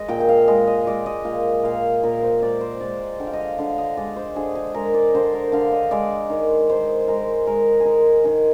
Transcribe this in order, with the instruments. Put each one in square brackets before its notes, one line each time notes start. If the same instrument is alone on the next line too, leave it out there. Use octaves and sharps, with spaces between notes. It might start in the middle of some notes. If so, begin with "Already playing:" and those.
Already playing: [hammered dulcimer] G#3 D#5
A#2 G5
G5
F5
G#3 D#5
D#5
G#3 D5
D#5
A#2 F5
A#2 F5
A#2 A#4
C5
G#3 D5
C5
G#3 D5
D3 G5
F5
D#5
F5
D3 F5
D#5
G#3 D5
C5
D3 G#4
G#4
G#3 A#4
D5
D3 C5
A#4
D3 F5
D#5
G#3 D5
D#3
D#3 C5
G#3 A#4
G#3 A#4
G#4
D#3 A#4
D#3 G#4